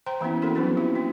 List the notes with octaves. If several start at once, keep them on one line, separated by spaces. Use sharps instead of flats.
C5 G5 A#5 C6
E3 A#3 B3 C#4 E4
C4 C#4 E4 F#4 A4 A#4
F3 F#3 B3 C#4 D4 F#4
A#3 E4 F4 G4
C#4 F#4